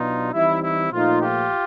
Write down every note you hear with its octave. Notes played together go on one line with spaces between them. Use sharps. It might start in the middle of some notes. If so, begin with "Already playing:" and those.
Already playing: B2 F#3 B3 D4 D#4 F4
E3 G3 C4 D#4 E4
E4
A#2 F3 A3 D#4 F4
F4 G4